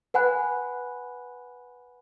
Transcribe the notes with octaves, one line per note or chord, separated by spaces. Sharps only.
B4 F#5 G#5 B5 F#6